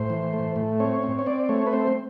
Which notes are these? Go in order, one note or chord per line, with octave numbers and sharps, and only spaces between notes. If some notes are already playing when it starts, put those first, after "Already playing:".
Already playing: A2 C5
E3
A3
A2
C4 C#5
C4
C#5
C4 D5
A3 C#5
B4
C4 C5